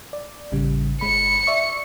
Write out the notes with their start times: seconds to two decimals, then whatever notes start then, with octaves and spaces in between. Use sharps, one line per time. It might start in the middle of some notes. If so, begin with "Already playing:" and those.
0.13 D5
0.52 A1 C#3 G3
1.01 G1 G#3 B5 C#7
1.47 D5 E5 C#6